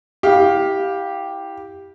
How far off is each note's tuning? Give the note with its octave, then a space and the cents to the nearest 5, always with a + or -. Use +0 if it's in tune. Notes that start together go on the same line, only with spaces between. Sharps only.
E4 -15 G4 +0 F5 +20